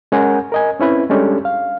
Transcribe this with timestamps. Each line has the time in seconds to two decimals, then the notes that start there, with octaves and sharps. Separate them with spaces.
0.12 G#3 C#4 A#4 F#5 G#5
0.52 A#4 D#5 G#5
0.80 C4 C#4 E4 B4
1.10 G3 G#3 C#4 D4 G4 A4
1.45 F5